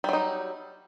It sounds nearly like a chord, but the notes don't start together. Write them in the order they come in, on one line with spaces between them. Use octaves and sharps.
G3 F#3 D#4